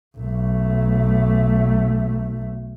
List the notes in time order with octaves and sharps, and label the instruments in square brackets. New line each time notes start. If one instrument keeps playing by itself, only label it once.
[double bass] B1 A3